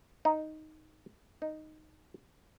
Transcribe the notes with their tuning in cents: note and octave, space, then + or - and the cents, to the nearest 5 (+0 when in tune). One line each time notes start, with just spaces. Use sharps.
D#4 +0
D#4 -5